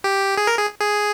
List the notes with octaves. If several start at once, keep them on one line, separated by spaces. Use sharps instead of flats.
G4
G#4
A#4
G#4
G#4